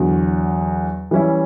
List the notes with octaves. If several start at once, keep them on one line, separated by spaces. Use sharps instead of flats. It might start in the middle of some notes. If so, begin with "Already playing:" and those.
Already playing: E2 D3 F#3
E3 G3 C#4 E4